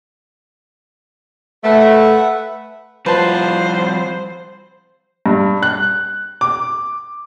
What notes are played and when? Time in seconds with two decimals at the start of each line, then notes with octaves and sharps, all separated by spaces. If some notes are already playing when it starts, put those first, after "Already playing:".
1.64 A3 B4 E5 F#5
3.06 F3 G3 F4 B4 C5 A5
5.26 G2
5.63 F#6
6.41 D6